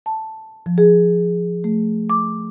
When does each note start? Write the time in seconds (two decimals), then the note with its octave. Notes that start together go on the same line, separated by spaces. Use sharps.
0.06 A5
0.66 F3
0.78 G#4
1.64 A3
2.10 D6